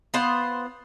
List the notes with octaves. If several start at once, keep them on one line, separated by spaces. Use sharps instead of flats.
B3 F4 C5 F#5